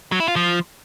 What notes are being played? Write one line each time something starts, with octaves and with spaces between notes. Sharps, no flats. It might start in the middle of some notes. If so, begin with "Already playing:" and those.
F#3
E4
F4
F3